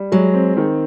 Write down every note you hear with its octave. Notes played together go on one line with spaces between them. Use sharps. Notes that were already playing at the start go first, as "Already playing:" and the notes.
Already playing: G3
F#3 G#3
C4
D#3